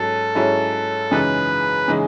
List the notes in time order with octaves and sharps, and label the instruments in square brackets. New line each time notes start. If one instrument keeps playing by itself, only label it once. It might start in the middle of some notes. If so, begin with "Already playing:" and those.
Already playing: [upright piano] G#2 F#3 C#4 [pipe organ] A4
[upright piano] G#2 F#3 C#4 E4
[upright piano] F#2 C#3 E3 G#3 D#4 [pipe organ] B4
[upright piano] C#3 E3 G#3 D#4